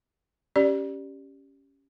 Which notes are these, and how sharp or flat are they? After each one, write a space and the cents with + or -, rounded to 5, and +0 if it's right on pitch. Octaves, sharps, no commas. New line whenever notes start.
C#4 +0 G4 +0 D5 +0